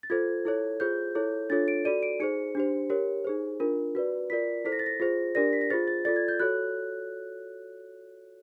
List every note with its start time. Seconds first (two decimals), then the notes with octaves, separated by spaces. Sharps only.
0.03 A6
0.10 F4 A4 C5 G#6
0.45 E4 A4 C#5
0.80 F4 G#4 C5 G6
1.15 E4 A4 C#5
1.50 D4 F4 A4 C#5 A6
1.68 D7
1.85 F#4 A4 D5 D#7
2.03 D7
2.20 D#4 G#4 C5 C#7
2.55 D4 G4 C5
2.90 G4 A#4 C#5
3.25 D#4 G#4 C5
3.60 D4 F4 A#4
3.95 F#4 B4 D5
4.30 F4 A#4 D5 B6
4.65 E4 A4 C5 B6
4.72 A#6
4.79 A6
4.86 A#6
5.00 F4 G#4 C5
5.35 D4 G4 A#4 D5 A#6
5.53 B6
5.61 A#6
5.70 F4 G#4 C5 A6
5.87 A6
6.05 F4 A4 D5 A6
6.16 G#6
6.28 G6
6.40 F#4 A4 C#5 F#6